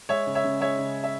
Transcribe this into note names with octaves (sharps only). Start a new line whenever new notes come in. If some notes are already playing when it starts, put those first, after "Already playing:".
G#3 C#5 E5
C#3
C#5 E5
C#3
G#3 C#5 E5
C#3
E5